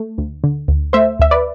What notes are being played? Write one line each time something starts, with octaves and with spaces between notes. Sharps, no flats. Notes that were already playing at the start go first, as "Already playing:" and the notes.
Already playing: A3
D2
D3
D2
A3 C5 E5
D2 E5
B4 D5